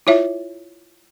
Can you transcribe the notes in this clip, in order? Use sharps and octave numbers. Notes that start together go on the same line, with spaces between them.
E4 F4 C#5 E5